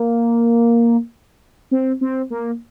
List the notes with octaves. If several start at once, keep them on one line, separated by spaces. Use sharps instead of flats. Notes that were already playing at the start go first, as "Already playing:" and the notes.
Already playing: A#3
C4
C4
A#3